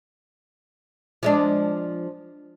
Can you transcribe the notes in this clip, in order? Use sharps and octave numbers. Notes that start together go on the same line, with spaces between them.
F3 G#3 D4